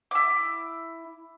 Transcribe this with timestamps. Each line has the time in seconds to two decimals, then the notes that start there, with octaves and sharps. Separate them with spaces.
0.11 E4 D6